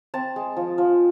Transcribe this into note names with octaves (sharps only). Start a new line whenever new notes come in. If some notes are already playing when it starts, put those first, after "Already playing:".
C4 A5
G#3
F3
F3